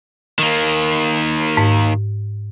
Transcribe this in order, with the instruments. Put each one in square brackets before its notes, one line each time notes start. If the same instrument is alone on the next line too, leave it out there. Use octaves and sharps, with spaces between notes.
[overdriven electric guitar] D#3 A#3
[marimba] G#2